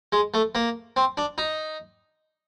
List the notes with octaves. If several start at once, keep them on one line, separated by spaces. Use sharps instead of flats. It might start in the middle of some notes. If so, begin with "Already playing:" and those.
G#3
A3
A#3
C4
D4
D#4